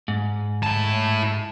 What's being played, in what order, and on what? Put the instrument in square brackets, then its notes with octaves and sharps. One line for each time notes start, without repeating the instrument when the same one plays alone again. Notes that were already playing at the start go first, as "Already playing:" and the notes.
[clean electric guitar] G#2
[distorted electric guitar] E4 A5